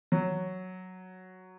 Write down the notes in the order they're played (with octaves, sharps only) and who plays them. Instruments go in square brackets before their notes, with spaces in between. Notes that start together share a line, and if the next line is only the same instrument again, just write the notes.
[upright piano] F#3